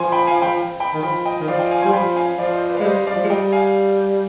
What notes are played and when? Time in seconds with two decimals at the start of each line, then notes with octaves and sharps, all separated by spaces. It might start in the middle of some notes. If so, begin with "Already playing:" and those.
Already playing: F3 G#5 C6
0.12 G5 B5
0.27 F5 G#5
0.42 G5 B5
0.80 G5 B5
0.94 D#3
1.03 F3 G5 B5
1.26 D#5 G5
1.40 D#3
1.48 F3 D5 F5
1.59 D#5 G5
1.71 F5 G#5
1.82 G3 G#5 C6
1.93 F3 G5 B5
2.16 F5 G#5
2.38 F3 D5 F5
2.54 C5 D#5
2.69 B4 D5
2.77 F5
2.80 G#3
2.84 G3 C5 D#5
2.99 G3
3.07 D5 F5
3.15 F3
3.23 G#3
3.29 G3 D#5 G5
3.52 F5 G#5